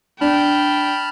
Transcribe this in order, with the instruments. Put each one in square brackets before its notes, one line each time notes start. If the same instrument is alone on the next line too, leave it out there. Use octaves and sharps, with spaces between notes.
[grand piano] D4 [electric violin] G5 [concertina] A5 B5 F6